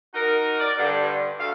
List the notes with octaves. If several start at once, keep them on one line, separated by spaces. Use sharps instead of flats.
D#4 F#4 A#4
D5
G2 D3
D2 A3 F5